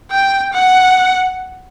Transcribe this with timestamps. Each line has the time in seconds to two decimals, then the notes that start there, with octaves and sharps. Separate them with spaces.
0.11 G5
0.53 F#5